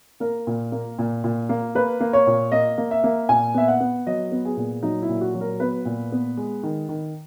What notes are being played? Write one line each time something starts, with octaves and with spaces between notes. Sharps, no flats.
A#3 A#4
A#2
A#3
A#2
A#2
A#3
A#3 B4
A#3
C#5
A#2
A#3 D#5
A#3
E5
A#3
A#2 G#5
B3 E5
F#5
B3
F#3 D#5
B3
G#4
A#2
F#3 D#4
E4
A#2
F#4
F#3
A#4
B3 B4
A#2
B3
G#3
D#3
D#3